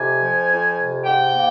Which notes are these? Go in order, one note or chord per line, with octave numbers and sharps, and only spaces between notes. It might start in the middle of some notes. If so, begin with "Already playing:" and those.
Already playing: F2 C3 G#5
F3
F2
C3
G#2 G5
A#3